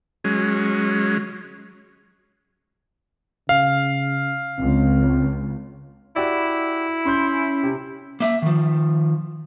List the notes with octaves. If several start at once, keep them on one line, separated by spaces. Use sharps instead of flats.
F#3 G#3 C#4
C#3 F5
C#2 C4
E4 F#4 G4 D5
C#4 B5 C6 G6
C3
A#3 E5
D#3 F3